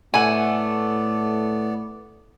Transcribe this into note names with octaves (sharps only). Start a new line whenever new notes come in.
A2 A3 B3 D5 F#5 G#5